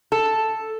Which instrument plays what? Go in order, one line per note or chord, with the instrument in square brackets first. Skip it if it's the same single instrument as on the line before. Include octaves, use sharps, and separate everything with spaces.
[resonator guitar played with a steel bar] A4